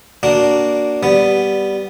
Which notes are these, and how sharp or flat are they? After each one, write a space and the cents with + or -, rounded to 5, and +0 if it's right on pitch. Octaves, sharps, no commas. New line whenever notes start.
A#3 -5 D4 -10 F#4 +0
G3 -5 B3 +0